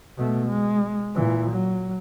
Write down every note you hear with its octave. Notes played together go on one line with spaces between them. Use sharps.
B2 A3
G#3
A#2 E3
F#3